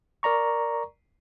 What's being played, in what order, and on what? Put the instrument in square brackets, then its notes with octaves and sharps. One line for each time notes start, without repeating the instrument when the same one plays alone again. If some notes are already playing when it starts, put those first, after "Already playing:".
[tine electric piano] A#4 D5 A#5 C#6